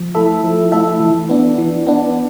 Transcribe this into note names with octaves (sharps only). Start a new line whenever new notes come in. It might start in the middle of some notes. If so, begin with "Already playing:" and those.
Already playing: F3
A3 E4 A4 E5
F3
A3 E4 A4 E5
E3
B3 D4
E3
B3 D4